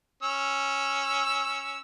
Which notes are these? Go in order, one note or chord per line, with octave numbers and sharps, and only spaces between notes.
C#4 E6